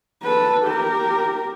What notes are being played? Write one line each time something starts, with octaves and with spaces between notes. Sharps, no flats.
A4 B4
G4 A#4